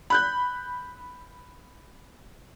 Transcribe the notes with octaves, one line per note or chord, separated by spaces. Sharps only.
B5 F#6 G6